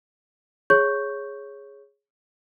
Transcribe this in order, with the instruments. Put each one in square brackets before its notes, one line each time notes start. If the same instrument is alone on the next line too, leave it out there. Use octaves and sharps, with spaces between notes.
[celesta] G#4 C#5 C#6 G6